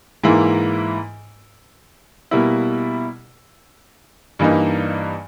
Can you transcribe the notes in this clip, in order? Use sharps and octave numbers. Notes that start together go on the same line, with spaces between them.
G#2 E3 A#3 E4
B2 G3 A#3 E4
G2 E3 A#3 D#4